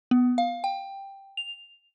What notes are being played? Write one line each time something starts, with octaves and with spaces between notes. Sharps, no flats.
B3
F5
G5
F7